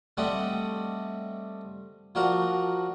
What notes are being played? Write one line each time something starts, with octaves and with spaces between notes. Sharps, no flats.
G3 A3 C4 D5 D#5 F#5
F3 D4 F#4 A#4 A#5